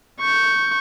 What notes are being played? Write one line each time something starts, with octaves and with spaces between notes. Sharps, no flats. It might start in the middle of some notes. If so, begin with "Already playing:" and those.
C#6 G6